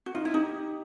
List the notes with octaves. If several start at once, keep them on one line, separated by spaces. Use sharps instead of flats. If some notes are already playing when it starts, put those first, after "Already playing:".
F#4
D#4 F4
E4
D#4 G4